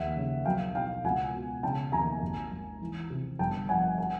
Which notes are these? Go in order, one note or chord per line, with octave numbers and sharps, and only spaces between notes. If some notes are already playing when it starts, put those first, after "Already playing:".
Already playing: D#2 E5 F#5
C#3
B1 F5 G5
B2 F5 G5
C#2 F#5 G#5
B2
C#3 G5 A5
D#2 G#5 A#5
G#1
G#2
E3
C3
G1 G5 A5
F2 F#5 G#5
F#5 G#5